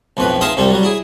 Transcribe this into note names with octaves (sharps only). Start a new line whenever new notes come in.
B1 F2 A2 B4
D#4 G#4 E5 F5 A5 C6
C2 F2 G3 A4
F#3 G3
E4 G#4